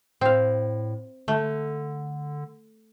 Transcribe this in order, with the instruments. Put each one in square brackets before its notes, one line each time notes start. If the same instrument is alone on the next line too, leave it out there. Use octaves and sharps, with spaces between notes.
[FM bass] A2 [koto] C4 F5
[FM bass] D3 [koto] A3